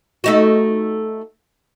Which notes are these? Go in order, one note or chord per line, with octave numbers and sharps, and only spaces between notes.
A3 D#4 F#4